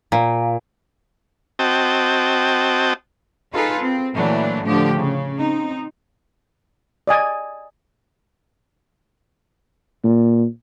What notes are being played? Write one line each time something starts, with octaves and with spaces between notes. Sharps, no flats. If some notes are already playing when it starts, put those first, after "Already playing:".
A#2
C4 F#4 D#5 G5 A5
D#4 F4 G#4 A4 B4
C4
A#2 E3 F#3 A3 D4
A2 D3 F3 G4
C#3
C4 D#4
D5 D#5 G#5
A#2